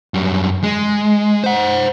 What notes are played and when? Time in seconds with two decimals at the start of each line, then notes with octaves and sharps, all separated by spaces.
0.14 F#2 G3
0.63 G#3
1.44 C5 F#5